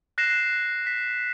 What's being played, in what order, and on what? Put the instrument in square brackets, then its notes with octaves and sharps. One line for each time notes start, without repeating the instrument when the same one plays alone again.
[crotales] F#6 A#6 C7 E7
B6